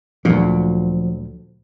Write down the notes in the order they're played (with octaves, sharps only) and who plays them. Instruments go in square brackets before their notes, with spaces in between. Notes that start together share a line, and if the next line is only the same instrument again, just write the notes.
[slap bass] D2 A#2 [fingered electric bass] F3 F#3